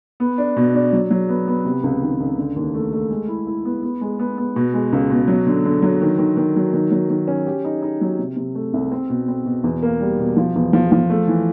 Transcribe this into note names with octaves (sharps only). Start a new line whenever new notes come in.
B3
D4
B2
D4
F#3
F#3
B3
B3
C3
C#2
D#3
C#2
D3
D#2
A3
A3
G#3
E4
E4
B3
B3
G#3
B3
B3
B2
G#3
C#2
B2
F#3
D3
D3
F#3
D#3
D#3
D#3
F#3
D#3
F#3
D#3
C#4
G4
D#4
D#4
F#3
C3
C3
A3
C2
C4
B2
C4
B2
E2
A#3
G3
B2
F3
E2
F3
F3
A3
E3